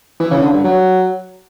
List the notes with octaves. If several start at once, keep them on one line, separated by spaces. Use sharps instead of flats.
E3
C#3
D3
G2
F#3